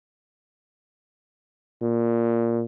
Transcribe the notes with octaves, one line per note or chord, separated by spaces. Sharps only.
A#2